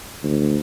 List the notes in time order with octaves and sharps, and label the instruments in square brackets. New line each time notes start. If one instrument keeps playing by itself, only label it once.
[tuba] D2